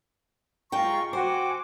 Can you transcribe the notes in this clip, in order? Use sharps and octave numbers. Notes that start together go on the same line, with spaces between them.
G#3 F4 G5 A#5 C#6
F#4 C5 G5 G#5 D6